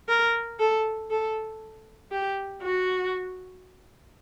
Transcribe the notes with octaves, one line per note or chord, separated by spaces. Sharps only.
A#4
A4
A4
G4
F#4